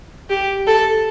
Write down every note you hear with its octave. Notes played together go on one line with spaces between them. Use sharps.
G4
A4